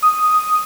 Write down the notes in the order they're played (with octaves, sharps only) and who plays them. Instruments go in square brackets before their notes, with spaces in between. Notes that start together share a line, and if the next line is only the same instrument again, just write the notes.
[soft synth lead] D#6